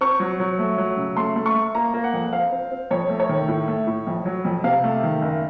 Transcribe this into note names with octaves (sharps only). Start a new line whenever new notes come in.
C4 C#6
F#3
F#3
A3
F#3
C#3
A3 C6
A3
C#6
A3
A#3 A#5
A#3
F#5
F2
C4 F5
C4
C4
F2 C#5
A3
C#5
D#3
A2
A3
A2
F2
F#3
F2
C3 F5
A3
D#3
F#1